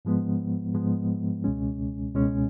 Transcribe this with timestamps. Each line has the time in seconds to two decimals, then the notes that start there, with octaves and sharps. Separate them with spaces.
0.05 G#2 F3 G#3 B3
0.74 G#2 F3 G#3 B3
1.44 C#2 B2 G#3 C#4
2.14 C#2 B2 G#3 C#4